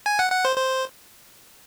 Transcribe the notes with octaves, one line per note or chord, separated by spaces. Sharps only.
G#5
F#5
F#5
C5
C5